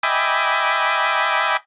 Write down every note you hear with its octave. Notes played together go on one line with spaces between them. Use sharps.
D#5 E5 G5 G#5 B5 D6